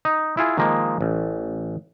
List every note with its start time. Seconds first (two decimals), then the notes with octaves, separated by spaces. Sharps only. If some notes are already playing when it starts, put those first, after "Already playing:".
0.05 D#4
0.37 E4 F4 G#4
0.57 D#3 F3 G#3 A#3
1.01 A1